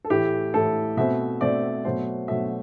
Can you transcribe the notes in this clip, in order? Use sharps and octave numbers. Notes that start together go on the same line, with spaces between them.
A4
A2 E3 A3 G4
A2 E3 A3 A4
B2 A3 C4 E5
B2 A3 C4 D5
B2 F#3 A3 C5
B2 F#3 A3 E5